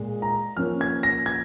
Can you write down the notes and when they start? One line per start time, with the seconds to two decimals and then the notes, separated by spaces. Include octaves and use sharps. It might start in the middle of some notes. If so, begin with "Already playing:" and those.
Already playing: A#2 G#3
0.22 A#5
0.57 F3 A#3 C#4 F6
0.81 G#6
1.03 A#6
1.26 G#6